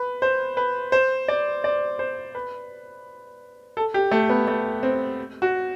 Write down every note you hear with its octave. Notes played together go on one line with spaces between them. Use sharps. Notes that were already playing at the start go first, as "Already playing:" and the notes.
Already playing: B4
C5
B4
C5
D5
D5
C5
B4
A4
G4
A3
B3
A3
C4
F#4